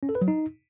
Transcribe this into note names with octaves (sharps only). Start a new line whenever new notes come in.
C#4
A4
B4
F#3
D#4